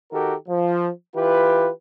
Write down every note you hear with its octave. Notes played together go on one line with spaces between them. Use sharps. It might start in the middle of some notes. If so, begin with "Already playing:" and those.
D#3 F#4 G4 A4 A#4
F3
E3 F4 G4 B4